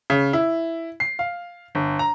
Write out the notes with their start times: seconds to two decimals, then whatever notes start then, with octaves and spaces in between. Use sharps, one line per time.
0.10 C#3
0.33 E4
1.00 C7
1.19 F5
1.75 G1
1.99 A#5